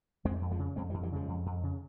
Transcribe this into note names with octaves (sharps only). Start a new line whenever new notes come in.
F2 G#3 C4
F2
F3 G#3
C#3
F2 G#3 C4
E3 G3
F2
E3 G3
C#3 F3 G#3
F2
F2
C#3